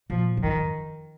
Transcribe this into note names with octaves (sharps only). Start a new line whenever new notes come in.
A#2 F3
F#2
G#2 D#3
F2